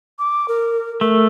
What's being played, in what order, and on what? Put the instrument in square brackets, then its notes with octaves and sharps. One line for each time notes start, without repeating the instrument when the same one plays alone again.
[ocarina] D6
A#4
[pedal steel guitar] A3 [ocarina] A#4